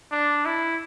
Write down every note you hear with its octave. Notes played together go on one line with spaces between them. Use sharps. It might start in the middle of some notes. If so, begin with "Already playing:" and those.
D4
E4